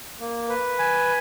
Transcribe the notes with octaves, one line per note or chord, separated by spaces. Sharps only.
A#3
B4
G#5